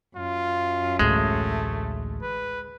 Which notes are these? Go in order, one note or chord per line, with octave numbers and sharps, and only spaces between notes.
F#2 F4
A1 D2 G#3 A3
B4